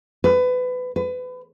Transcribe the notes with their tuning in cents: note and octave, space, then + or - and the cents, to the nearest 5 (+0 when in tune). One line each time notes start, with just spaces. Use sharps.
B4 +25
B4 +30